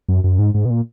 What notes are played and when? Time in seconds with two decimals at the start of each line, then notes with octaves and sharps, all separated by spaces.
0.09 F#2
0.24 F#2
0.39 G#2
0.54 G#2
0.65 B2
0.70 A#2